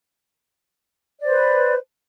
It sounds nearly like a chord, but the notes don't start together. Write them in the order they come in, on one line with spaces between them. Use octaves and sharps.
D5 C5 B4